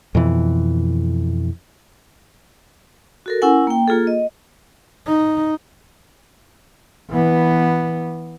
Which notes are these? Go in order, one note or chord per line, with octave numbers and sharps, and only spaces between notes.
F2 B2 E3
F#4 A4 A#4
C#4 E4 A#4 F#5 G#5
A#3 G5
A#3 F4 G#4 A4
D#5
D#4
E3 B3